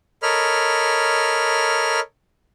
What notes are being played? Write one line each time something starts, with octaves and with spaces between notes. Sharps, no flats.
A4 A#4 C#5 D#5 B5 F6